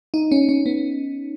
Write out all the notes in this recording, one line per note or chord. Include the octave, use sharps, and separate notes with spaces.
D#4
C#4
C#4
B3